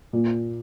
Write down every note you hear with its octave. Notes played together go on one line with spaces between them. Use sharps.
A#2